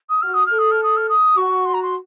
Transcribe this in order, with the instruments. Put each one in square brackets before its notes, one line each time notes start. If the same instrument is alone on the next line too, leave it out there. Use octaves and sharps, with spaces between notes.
[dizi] D#6
[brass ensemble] F#4 [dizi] F6
[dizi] D#6
[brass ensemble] A4 [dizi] F6
[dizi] D#6
F6
D#6
F6
D#6
[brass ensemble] F#4 [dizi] C#6
[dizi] C6
A#5
C6